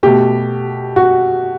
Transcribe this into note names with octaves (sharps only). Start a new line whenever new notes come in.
B2 A3 G4
F#4